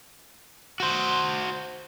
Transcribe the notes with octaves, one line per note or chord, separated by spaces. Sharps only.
F#4 C5